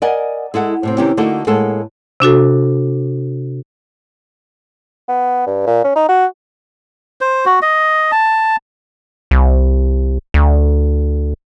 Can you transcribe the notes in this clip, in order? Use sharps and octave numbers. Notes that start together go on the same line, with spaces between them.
A#4 D5 D#5 F#5 G#5
G#3 E4 A4 F#5
A2 C3 C4
C3 D#3 E3 C4 C#4 G4
D3 A3 A#3 D#4 F#4 A4
A2 G#3 A#3 A4 F#5 A5
C3 D4 F#4 A4
B3
G2
A#2
C#4
D#4
F#4
C5
F#4
D#5
A5
C2
D2